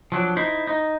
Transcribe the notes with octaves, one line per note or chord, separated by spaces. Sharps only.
F3 F#3 D4
D#4 E4 C5
D#4